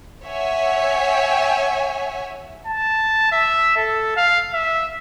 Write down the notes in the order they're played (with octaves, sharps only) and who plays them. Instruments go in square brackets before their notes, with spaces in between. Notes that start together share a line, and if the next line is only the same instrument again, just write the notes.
[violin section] C#5 E5 F#5 G#5
[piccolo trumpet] A5
E5
A4
F5
E5